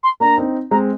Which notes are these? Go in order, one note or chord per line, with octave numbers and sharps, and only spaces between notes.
C6
A#3 D4 A#5
C4 D#4
G#3 C4 A#5